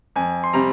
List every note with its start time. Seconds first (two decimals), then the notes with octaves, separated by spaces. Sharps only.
0.16 F2 G#5
0.44 C6
0.53 C3 G3 C4 A#5